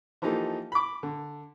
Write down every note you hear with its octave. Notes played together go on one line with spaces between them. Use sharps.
E3 F3 A#3 D#4 G4 A4
B5 D6
D3